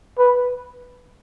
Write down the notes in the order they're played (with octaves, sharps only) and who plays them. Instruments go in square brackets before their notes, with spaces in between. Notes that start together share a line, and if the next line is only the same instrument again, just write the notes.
[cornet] B4